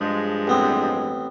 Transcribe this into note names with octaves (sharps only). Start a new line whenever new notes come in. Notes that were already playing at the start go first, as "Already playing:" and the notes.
G2 F3 G#3
A1 B3 C4